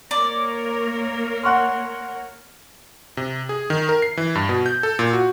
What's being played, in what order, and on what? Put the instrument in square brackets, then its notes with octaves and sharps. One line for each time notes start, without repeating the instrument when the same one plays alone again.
[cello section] A#3 A#4 C#5 [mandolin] D5
[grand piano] F#5 F6 [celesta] C6 C#6 F#6
[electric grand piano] C3
G#4
D#3
A#4
C7
E3
G2
B2
G6
A4
A#2
F#4